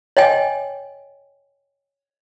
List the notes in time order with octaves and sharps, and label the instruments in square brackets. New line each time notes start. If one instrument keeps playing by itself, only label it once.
[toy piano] C#5 D#5 G5 G#5